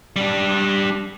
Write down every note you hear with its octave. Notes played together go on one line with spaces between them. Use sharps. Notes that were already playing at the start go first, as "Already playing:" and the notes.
G3 D4